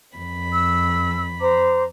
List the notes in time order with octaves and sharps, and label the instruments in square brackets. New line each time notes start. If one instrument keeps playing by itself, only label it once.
[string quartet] F2 B5
[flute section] E6
C5 A#5 D6